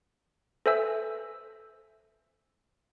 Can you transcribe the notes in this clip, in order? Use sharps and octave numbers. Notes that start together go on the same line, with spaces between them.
A4 B4 C5 E5 G#5 E6